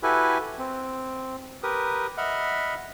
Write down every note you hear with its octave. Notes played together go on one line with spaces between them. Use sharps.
E4 F#4 G4 A4 B4 G#5
C4
G4 A#4 B4 D#6
D#5 E5 F#5 B5 F6